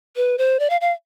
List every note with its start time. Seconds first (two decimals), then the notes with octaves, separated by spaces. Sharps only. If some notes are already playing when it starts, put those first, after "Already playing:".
0.16 B4
0.38 C5
0.60 D5
0.70 F5
0.81 F5